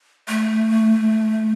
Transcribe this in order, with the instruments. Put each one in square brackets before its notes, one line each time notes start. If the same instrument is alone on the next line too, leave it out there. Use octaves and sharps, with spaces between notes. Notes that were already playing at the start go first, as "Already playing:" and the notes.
[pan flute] A3